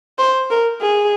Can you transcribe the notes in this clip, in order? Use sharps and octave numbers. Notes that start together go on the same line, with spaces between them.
C5
A#4
G#4